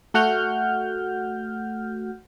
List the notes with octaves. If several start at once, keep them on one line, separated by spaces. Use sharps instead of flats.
A3 F#4 F#5 F6 G6